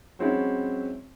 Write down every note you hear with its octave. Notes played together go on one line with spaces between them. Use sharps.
F#3 G#3 C4 C#4 E4